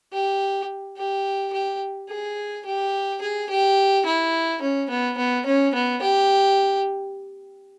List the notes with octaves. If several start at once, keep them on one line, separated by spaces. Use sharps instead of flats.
G4
G4
G4
G#4
G4
G#4
G4
E4
C#4
B3
B3
C#4
B3
G4